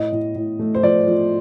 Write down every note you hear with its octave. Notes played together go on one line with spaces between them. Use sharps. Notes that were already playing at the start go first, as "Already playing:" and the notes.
Already playing: A2 D#5
A2
A2
A3
C5
F3 D5
F3